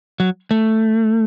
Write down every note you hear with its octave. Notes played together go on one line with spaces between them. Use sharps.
F#3
A3